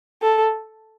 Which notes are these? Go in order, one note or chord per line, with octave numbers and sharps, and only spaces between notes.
A4